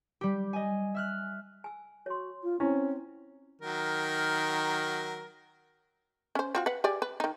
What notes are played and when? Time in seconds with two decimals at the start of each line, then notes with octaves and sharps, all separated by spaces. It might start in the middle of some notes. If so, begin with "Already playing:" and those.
0.21 G3 G4
0.53 D#5 G#5
0.95 E5 F6 F#6
1.64 G#5 E6
2.06 F#4 C#5 C6
2.43 F4
2.60 C4 C#4 E4
3.62 D#3 F#3 A#4
6.35 C#4 C5
6.55 C4 F4 F#4
6.66 B4 F#5
6.84 G4 G#4 D5
7.02 B4
7.20 D#3 D#4